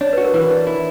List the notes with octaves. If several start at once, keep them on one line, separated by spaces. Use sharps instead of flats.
D4 C#5
F#4 B4
A#4
E3 B4
D4
E4